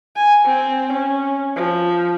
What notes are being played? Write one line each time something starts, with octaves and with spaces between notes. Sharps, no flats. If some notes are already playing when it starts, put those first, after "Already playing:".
G#5
C4
C#4
F3